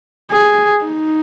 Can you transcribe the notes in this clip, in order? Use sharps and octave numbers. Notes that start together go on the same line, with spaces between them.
G#4
D#4